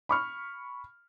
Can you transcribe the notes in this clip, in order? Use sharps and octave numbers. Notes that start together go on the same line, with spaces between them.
B5 C#6 F6